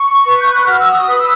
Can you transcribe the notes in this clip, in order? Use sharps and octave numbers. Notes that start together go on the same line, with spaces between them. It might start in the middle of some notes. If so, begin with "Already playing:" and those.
Already playing: C#6
B4
G6
F#6
F#4 F6
E6
D#6
B4
E6